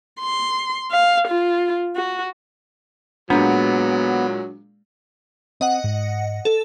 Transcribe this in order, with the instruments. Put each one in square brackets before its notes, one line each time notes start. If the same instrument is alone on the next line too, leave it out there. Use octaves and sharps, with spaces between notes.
[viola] C6
F5
F4
F#4
[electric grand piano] A#2 G#3 A#5 [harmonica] F#3 [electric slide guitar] B3 [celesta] D4
[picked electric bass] C4 [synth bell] D#5 F#5
[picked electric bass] G#2
[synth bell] A4